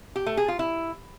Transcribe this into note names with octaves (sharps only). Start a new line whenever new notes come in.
G4
A3
G#4
F4
E4